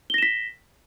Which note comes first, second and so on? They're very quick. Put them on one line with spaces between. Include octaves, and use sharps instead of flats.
G7 A#6 E7 B6